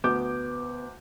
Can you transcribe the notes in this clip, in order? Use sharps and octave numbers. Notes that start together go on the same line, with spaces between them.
D2 B3 D6 G6